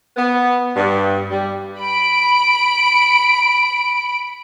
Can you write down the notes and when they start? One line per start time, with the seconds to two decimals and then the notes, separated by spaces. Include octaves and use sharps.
0.16 B3
0.76 G2
1.30 G3
1.79 B5 D7